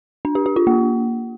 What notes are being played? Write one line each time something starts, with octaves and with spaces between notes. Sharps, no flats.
D4
G4
G4
F4
A#3